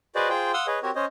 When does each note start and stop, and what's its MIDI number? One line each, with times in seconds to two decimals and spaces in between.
0.15 0.29 66
0.15 0.29 68
0.15 0.29 71
0.15 0.29 72
0.15 0.29 74
0.15 0.29 75
0.29 0.52 65
0.29 0.52 68
0.29 0.52 72
0.29 0.52 79
0.54 0.66 77
0.54 0.66 78
0.54 0.66 84
0.54 0.66 87
0.54 0.66 88
0.67 0.79 68
0.67 0.79 71
0.67 0.79 73
0.67 0.79 75
0.83 0.91 60
0.83 0.91 66
0.83 0.91 67
0.83 0.91 70
0.83 0.91 73
0.95 1.05 61
0.95 1.05 72
0.95 1.05 73
0.95 1.05 75